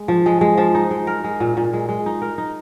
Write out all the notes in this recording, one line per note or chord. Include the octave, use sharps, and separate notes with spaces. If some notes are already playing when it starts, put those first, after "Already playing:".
Already playing: G#3
F3
G#3
G#3
F3
D#4
G#3
A#4
G#3
A#2
A#2
G#3
G#3
D#4
A#4
D#4